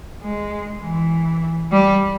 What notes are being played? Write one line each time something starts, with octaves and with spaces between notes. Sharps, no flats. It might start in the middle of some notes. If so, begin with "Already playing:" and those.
G#3
E3
G3